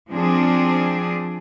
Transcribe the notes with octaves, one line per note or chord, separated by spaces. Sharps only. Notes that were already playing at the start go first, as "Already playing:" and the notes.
F3 C4 D4 G#4